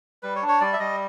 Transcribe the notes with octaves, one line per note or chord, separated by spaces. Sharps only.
G3 B4
C#5
D4
C#5
G3 D5
E5
G3 D#5